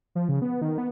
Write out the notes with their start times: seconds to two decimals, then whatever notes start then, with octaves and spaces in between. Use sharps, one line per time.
0.15 F3
0.29 C#3
0.42 B3
0.61 D#3
0.78 B3